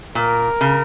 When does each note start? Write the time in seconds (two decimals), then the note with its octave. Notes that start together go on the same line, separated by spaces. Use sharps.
0.15 A#2 A#4
0.61 C#3